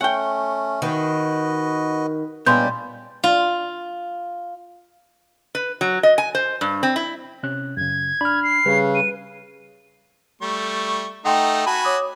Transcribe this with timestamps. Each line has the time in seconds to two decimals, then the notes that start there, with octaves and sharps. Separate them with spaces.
0.01 A3 C#4 F#5 G5
0.82 D#3 F#4 B4 D#5
2.46 A#2 G3 G#3 B3 C#4 D4 C6 G6
3.24 F4
5.55 B4
5.81 F#3
6.03 D#5
6.18 G#5
6.35 C5
6.61 G2
6.83 C4
6.96 E4
7.43 C3 C#4 F#6
7.77 F#2 C#3 G#6
8.21 D4 B5 F6
8.44 C7
8.66 C#3 G3 B4
8.95 D#7
10.42 G3 A3 C#6
11.25 A3 D#4 F#5 G5 C6
11.67 F#4 G#5 A5 B5
11.85 C#5 D6 D#6